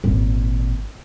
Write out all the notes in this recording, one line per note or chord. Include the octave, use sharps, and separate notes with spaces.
G#1 A#2